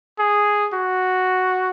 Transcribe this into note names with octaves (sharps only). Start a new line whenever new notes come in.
G#4
F#4